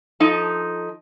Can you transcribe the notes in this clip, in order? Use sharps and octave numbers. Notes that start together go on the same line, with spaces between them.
F3 D#4 A4